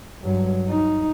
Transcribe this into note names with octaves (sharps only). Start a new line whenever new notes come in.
G2 F#3
D#4